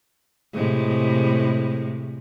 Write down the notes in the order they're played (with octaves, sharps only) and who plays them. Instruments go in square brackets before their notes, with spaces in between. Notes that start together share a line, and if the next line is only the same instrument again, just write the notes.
[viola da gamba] A2 C3 G#3